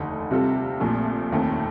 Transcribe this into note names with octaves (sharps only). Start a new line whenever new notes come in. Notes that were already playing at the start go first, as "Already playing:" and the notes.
Already playing: F1 D#2 D3 A3 D#4
C3 G3 C4 F4 A4
A#1 A#2 F3 A3
F1 D#2 D#3 A3 C4